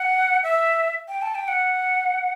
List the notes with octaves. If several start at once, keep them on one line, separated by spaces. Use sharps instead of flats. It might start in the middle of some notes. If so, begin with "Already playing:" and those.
Already playing: F#5
E5
G5
A5
G5
F#5